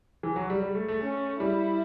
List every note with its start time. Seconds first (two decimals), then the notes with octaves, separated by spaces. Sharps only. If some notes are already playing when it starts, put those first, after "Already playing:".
0.23 E3
0.36 F#3
0.50 G3
0.62 G3
0.75 A3
0.88 A3
1.02 C#4
1.40 G3 E4